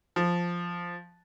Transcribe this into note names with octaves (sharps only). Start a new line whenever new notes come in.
F3